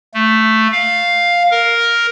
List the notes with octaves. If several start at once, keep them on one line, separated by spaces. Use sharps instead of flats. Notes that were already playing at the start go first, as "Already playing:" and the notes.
A3
F5
A#4